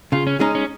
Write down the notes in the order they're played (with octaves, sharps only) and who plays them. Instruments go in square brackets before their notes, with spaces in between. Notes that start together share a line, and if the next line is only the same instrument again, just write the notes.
[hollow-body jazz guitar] C#3 [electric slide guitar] F4
[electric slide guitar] C#4
[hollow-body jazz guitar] G#3 D#4 [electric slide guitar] C#4
[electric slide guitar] C#4